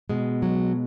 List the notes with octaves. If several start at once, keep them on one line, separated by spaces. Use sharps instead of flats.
B2 G#3
F#3